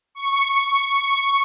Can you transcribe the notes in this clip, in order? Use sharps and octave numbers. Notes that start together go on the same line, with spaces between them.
C#6
C#6